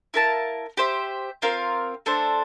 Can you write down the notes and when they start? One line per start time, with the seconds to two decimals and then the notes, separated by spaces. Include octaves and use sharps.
0.14 E4 A#4 F5 A5
0.77 G4 C5 E5
1.42 C4 F4 A#4 F5
2.06 A3 D4 A4 C5